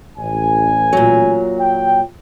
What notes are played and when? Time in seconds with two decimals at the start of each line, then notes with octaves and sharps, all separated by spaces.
0.18 A1 G#5
0.93 A#2 F#3
1.60 G5